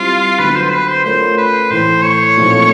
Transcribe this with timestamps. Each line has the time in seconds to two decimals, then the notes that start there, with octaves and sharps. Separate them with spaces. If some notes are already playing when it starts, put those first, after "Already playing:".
Already playing: G3 C4 E4 F4
0.39 D3 F#3 B3 B4
0.55 C5
0.72 B4
0.88 C5
1.05 A3 C#4 F4 A#4 C5 C#5
1.38 B4
1.70 A2 E3 A3 C5
2.04 C#5
2.37 A#2 F3 A3 C4 D#4